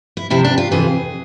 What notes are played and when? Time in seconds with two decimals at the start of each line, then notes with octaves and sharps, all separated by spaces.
0.17 E4
0.30 E2 C3 F3 E4
0.44 D4
0.58 F4
0.71 F2 C3 E3 G#4